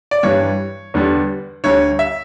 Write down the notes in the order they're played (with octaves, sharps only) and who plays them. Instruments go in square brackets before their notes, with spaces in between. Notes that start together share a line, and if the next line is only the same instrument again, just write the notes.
[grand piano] D5
G2 E3 G3 C#5
E2 D3 G3
D2 D3 G3 C#5
E5